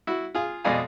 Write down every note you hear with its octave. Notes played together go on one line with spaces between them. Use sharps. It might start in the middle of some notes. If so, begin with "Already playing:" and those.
E4 F#4
F4 G#4 F5
F2 B2 G#3 D5 F5 G#5